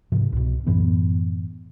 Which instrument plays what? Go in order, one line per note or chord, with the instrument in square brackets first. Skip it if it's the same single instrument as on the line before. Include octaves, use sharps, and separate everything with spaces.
[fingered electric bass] G#2 C3 F3
C2 B2
F#2 A2 E3 B3